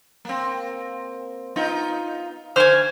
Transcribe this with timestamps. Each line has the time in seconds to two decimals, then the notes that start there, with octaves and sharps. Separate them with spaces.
0.25 A#3 C4
1.56 B3 D#4 F4
2.56 D3 C5 G#5 F6